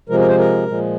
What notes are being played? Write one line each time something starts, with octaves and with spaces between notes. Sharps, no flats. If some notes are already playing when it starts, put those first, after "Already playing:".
C3 F3 G#3 A#4
A#4
C5
A#4
A#2 F3 G#3